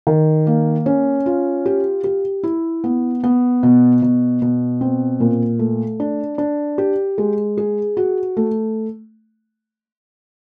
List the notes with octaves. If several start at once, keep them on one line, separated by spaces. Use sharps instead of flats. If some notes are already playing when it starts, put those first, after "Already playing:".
D#3
A#3
C#4
F4
G4
G4
E4
B3
B3
B2
B2
B2
C4
A#2
A3
D4
D4
G4
G#3
G#4
F#4
A3